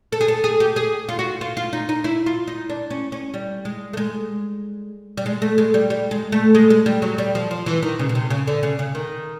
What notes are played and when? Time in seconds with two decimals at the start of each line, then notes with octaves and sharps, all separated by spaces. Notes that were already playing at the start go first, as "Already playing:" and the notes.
0.12 A4
0.21 G#4
0.28 A4
0.44 G#4
0.60 G4
0.76 G#4
1.09 F4
1.19 F#4
1.41 F4
1.57 F4
1.73 D#4
1.89 D#4
2.04 E4
2.26 F4
2.47 D#4
2.70 D4
2.90 C#4
3.12 C#4
3.34 G3
3.65 G#3
3.93 A3
3.97 G#3
5.17 G3
5.26 G#3
5.42 A3
5.58 G#3
5.74 G3
5.90 G3
6.11 G#3
6.32 A3
6.55 G#3
6.70 G#3
6.86 G3
7.02 F#3
7.18 G3
7.35 F3
7.51 F3
7.66 E3
7.82 D#3
7.99 C#3
8.09 B2
8.15 C3
8.30 C#3
8.47 D3
8.63 C#3
8.79 C#3
8.95 D#3